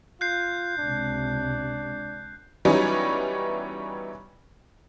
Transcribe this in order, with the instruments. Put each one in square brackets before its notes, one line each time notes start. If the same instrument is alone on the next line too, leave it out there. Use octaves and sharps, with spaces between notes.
[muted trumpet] F4 [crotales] F#6 G6 C7
[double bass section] C#2 C3 [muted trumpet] D4
[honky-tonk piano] E3 F#3 G3 B3 C#4 D#4